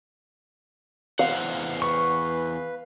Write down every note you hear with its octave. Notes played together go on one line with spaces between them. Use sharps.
E2 C5 F5 F#5
B4 C#6